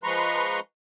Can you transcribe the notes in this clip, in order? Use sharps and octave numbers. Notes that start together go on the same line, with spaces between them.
F3 G#3 B4 A#5 C6 C#6